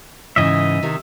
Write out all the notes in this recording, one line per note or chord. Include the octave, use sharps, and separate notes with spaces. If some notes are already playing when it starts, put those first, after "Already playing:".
G#2 C#3 E3 D#5 E5
C3 D#3